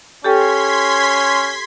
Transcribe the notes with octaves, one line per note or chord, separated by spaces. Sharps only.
C#4 G4 A4 G5 C6 G#6 B6